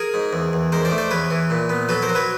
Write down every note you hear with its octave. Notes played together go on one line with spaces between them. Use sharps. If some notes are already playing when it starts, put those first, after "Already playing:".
Already playing: G#4 A#4
G#2
E2
E2
G#2 A#4 C5
C5 D5
A3
C5 D5
E2 B4 C#5
E3
A#2
B3
F#3 A4 B4
A#4 C5
F#3
B4 C#5